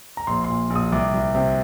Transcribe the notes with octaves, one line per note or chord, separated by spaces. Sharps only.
A#5
A#1 C6
A#2 C6
A#1
D#6
C2 D6
C2
C3